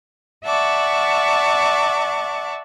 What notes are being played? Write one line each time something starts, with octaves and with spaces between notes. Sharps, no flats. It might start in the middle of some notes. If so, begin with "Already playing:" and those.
D5 E5 F#5 A5 C#6 D6